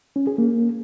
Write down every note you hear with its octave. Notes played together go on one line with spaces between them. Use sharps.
C#4
G#4
A#3